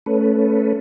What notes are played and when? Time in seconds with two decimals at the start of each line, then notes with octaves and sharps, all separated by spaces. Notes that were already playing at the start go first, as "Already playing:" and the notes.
0.06 A3 C#4 A4 B4